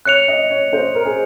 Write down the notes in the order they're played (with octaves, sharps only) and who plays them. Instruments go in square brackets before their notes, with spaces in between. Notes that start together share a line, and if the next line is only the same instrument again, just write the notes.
[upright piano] C#5 [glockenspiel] F#6 C#7 F7
[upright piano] D#5
C#5
C5
A#4
G#4